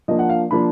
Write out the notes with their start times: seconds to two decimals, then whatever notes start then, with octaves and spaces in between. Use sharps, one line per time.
0.08 F3 A#3 D4 D#5
0.19 F#5
0.29 F5
0.51 F3 A#3 D4 B5